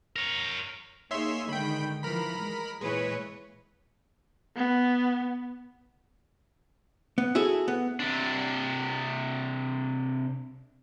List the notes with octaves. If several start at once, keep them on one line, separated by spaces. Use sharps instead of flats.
A#4 C#5
A#3 D#4 G#4 C#5 E5 C6
D3 D#3 G#3 G5 B5
E3 F3 A#4 B5
G#3
A#2 E3 G#3 B4 C#5
B3
B3
E4 F#4 G#4 A4
B3
C3 D4